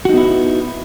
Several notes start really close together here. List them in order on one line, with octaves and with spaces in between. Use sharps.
F#4 D#4 B3 E4